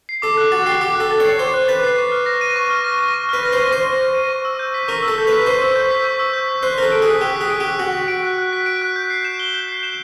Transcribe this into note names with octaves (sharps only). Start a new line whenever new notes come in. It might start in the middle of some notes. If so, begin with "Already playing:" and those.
C7
A4 D6
F#6
F#4 A6
G4 C7
G4 D6
F#6
A4
A6
C#5 C7
C5 D6
F#6
B4 A6
C7
C#6
F6
A#6
D#7
C#6
F6
A#6
D#7
C#6
B4 F6
A#6
C5 D#7
C5 C#6
F6
A#6
D#7
C#6
E6
G6
B6
A#4 C#6
E6
A4
G6
B4
B6
C5 C#6
E6
G6
B6
C#6
E6
G6
B6
C5 F#6
A4 A#4 B6
D7
G#4 F#6
G4 F#6
B6
G#4
D7
G4 F#6
F#4 F#6
B6
D7
F#6
F#6
B6
D7
F#6
G6
C7
E7
G7
G6
C7
E7